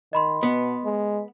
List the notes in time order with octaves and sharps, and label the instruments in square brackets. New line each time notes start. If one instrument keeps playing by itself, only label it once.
[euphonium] D#3 [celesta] D#5 B5 C6
[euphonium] B2 [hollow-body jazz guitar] B3
[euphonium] G#3